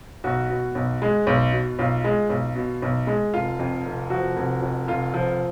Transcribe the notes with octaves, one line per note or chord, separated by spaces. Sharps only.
B1 F#4
B2
B1
G#3
B1
B2
B1 F4
G#3
B1
B2
B1
G#3
F1 F4
F2
F1
F3 F#4
F1
F2
F1 F4
F3